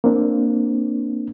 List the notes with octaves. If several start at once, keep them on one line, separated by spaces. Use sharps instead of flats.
A#3 C4 D4